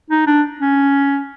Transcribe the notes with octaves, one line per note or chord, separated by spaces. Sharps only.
D#4
D4
C#4